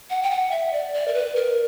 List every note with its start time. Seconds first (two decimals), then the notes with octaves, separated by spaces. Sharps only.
0.10 F#5
0.23 G5
0.31 F#5
0.51 E5
0.73 D5
0.94 D5
1.08 A#4
1.14 B4
1.36 A#4